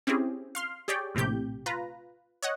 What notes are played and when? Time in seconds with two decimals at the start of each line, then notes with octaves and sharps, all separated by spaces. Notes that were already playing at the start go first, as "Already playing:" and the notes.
0.07 C4 C#4 E4 G4 G#4
0.55 F5 C6 F6
0.88 G4 G#4 C#5 D5 G5
1.15 A#1 A2 C3 G4 G6
1.66 F4 B4 A#5
2.42 C#5 D#5 F#5